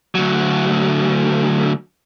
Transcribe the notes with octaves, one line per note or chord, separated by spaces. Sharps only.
D2 F#3